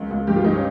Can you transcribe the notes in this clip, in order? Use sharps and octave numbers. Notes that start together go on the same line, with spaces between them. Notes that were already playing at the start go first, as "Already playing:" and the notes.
Already playing: C#2 A#4
C#2
G2 G4
F4
G2 D#4
C#4